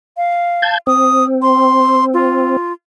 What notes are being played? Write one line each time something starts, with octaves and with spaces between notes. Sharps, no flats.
F5
A5 G6 G#6
C4 D#6
C6
F4